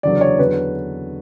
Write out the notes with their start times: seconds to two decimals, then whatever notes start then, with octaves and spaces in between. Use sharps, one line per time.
0.03 F#1 E2 D3 F#3 D5
0.21 C#5
0.38 E2 D3 F#3 B4